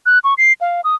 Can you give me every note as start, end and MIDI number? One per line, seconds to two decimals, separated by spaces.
0.06 0.19 90
0.24 0.34 85
0.38 0.53 96
0.61 0.81 77
0.84 0.95 87